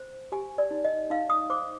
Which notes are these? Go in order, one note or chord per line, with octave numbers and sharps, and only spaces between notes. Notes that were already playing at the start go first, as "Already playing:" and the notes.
Already playing: C5
G4 G#5
D5
D#4
D#5
D#4 F5
D#6
C5 D6